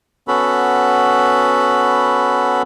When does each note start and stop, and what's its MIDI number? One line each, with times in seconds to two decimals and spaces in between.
0.28 2.62 59
0.28 2.62 61
0.28 2.62 66
0.28 2.62 69
0.28 2.62 83